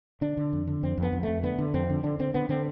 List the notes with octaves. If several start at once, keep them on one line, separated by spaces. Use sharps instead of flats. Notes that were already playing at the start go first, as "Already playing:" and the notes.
D3 D4
D3
F2
D3
F2 C4
F2
B3
F2
F2 A3
D3 B3
D3
F2 C4
D3
D3 D4
D3 C4
D3 B3
D3 C4